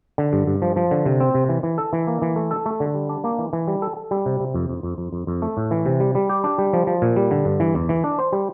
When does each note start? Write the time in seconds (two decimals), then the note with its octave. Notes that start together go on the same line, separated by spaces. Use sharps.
0.18 D3
0.33 G2
0.47 G2
0.62 F3
0.76 F3
0.91 D3
1.06 C3
1.20 C4
1.35 C3
1.49 E3
1.63 E3
1.78 A4
1.93 E3
2.07 A#3
2.22 E3
2.36 A3
2.51 A4
2.66 A3
2.80 D3
2.95 G3
3.09 D4
3.24 A#3
3.38 E3
3.53 E3
3.68 G3
3.82 A4
3.97 A4
4.11 G3
4.26 C3
4.40 C3
4.54 F2
4.69 F2
4.83 F2
4.98 F2
5.13 F2
5.27 F2
5.42 A3
5.57 A2
5.71 E3
5.86 C3
6.00 G3
6.15 G3
6.29 G4
6.44 D4
6.58 G3
6.73 F3
6.87 F3
7.02 A#2
7.16 G3
7.31 D3
7.45 G2
7.60 E3
7.75 E2
7.89 E3
8.04 D4
8.19 C5
8.33 G3